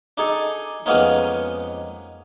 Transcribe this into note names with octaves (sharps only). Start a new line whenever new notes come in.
D4 D#4 G#4 A4
F2 G#3 A#3 B3 C#4 D#4